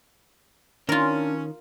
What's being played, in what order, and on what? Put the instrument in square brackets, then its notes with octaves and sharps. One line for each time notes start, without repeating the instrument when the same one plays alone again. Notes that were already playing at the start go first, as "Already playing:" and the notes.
[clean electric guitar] D#3 [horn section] C#4 [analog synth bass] D4 [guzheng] F4 A#4